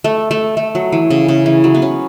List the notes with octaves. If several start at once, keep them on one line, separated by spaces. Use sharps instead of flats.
A3
A3
A3
F#3
E3
C#3
C#3
E3
F#3
B3
C#4